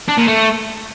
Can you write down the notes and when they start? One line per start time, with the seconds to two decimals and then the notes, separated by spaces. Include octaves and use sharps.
0.08 D4
0.18 A#2
0.27 A3